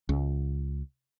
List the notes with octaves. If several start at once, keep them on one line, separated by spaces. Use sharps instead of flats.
C#2